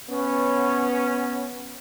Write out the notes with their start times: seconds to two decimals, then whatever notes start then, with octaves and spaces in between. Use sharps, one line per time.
0.10 B3 C#4